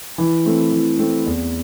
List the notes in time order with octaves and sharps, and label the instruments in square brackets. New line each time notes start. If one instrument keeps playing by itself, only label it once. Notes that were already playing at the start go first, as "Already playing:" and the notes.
[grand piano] E3
A3 C4
E3
A3 C4
E2